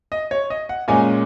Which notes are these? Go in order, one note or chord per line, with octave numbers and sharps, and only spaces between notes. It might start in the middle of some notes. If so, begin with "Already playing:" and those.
D#5
C#5
D#5
F#5
A#2 G#3 C#4 G#5